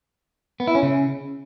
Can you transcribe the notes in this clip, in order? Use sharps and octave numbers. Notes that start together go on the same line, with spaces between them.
B3
E4
C#4
C#3